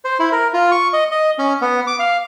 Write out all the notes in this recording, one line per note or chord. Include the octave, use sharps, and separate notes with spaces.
C5
E4
A#4
F4
C#6
D#5
D#5
C#4
B3
D6
F5